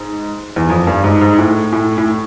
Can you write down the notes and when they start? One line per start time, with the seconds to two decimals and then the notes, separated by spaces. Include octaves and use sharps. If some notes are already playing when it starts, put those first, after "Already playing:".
Already playing: G#2
0.56 E2
0.70 F2
0.87 G2
1.04 G#2
1.21 G#2
1.38 A2
1.72 A2
1.98 A2